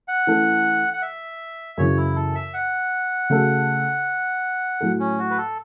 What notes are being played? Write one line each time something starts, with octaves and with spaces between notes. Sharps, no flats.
F#5
E3 A3 C#4 A4
F#5
E5
F#2 C#3 E3 C#5
E4
A4
E5
F#5
C#3 A3 F#4 A4
A2 F#3 A3 E4 A4
C#4
F#4
B4
A4